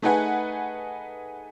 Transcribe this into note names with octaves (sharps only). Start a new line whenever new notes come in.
A3 D#4 G#4 B4 F#5 G#5